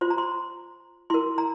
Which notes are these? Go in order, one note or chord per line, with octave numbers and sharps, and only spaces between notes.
F4 C5 C6
A#5
C6
E4 A#4 C6
A#5